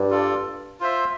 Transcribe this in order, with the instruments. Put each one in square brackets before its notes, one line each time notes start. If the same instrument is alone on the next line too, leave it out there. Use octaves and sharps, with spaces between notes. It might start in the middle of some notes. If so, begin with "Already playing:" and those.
Already playing: [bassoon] G2
[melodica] F4 A4 D5
F4 C5 E5